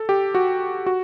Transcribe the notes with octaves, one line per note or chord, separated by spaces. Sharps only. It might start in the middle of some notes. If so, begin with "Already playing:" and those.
Already playing: A4
G4
F#4
F#4